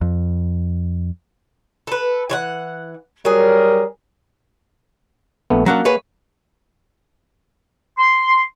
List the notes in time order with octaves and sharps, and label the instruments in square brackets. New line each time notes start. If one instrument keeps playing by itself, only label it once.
[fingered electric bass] F2
[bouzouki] A4 B4
E3 C#5 F#5
[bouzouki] F#3 G#4 [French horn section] G3 A#4
[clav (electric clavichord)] A#1 A3 B3
[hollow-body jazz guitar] F#3 C#4 D4 [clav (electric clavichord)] A#3 F#5 A#5
[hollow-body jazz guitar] G#4 B4 C#5
[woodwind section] C6